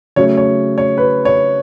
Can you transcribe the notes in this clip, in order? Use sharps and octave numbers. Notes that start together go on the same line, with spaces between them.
C#3 F#3 A3 C#5
C#5
C#5
B4
C#5